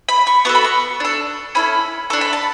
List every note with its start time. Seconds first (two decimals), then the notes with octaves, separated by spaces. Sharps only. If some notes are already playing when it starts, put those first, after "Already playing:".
0.09 B5
0.27 C#6
0.45 B3 F#4 A4 C#6
0.55 B5
0.64 C#6
1.00 D4 A4
1.55 C#4 E4 A4 B5
2.10 D4 A4 C#6
2.21 B5
2.33 A5